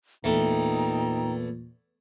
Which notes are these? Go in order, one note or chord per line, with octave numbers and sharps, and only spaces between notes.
E2 A#2 A3 D#4 G5 A#5